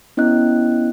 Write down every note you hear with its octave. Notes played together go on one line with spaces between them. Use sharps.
B3 C#4 E4 D#5 F#6